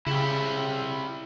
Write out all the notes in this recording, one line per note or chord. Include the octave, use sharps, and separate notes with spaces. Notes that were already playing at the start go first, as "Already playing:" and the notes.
C#3 E4 G4